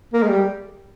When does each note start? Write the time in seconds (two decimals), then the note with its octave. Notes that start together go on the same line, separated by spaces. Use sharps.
0.13 A#3
0.22 G#3
0.28 G3